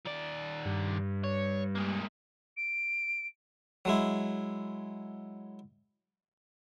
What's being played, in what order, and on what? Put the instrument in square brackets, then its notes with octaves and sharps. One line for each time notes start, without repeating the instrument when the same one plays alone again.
[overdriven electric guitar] D#3 D5
[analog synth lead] G2
[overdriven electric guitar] C#5
G#3 A#3
[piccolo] D7
[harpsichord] F#3 G#3 E4